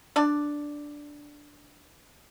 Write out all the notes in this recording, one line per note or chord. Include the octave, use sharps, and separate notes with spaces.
D4 D5